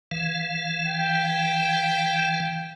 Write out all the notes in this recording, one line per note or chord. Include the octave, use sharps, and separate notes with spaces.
E3 F5
G5